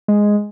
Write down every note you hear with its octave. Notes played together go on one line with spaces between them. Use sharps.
G#3